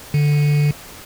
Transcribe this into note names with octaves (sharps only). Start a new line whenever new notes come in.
D3